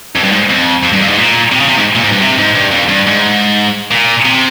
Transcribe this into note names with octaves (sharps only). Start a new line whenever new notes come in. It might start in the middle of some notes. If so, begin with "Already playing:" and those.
F2
G2
G#2
F2
F2
G2
F2
G#2
A#2
C3
C#3
C3
G#2
A#2
G#2
G2
C3
G#2
G2
F2
G2
G#2
A#2
C3